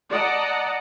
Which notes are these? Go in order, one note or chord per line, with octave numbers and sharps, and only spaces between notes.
D5 D#5 F#5 A5 A#5